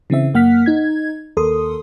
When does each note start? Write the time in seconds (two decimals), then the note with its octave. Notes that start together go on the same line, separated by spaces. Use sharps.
0.10 C#3 E3 C4 E5
0.34 F#2 A#3 F#5 F6 B6
0.66 D#4 G#6
1.37 D#2 A4 A#4 C6 D#6